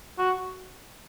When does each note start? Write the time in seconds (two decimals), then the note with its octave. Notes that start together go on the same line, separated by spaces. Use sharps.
0.19 F#4